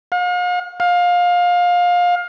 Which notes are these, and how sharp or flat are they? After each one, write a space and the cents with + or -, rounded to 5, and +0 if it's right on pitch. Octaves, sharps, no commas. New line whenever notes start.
F5 +45
F5 +25